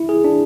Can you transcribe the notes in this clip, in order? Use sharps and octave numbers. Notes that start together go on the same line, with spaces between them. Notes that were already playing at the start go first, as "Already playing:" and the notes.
Already playing: E4
G#4
D4